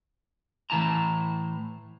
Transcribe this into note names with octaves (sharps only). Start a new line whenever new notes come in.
A2 E3 E4 A5 A#5